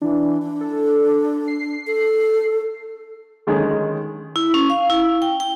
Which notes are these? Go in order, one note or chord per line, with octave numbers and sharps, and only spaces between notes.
E3 D4
D4
A4
C7
A4
D3 D#3 G#3 C#4 G#4
E4
C#4
F5
E4
G5
G5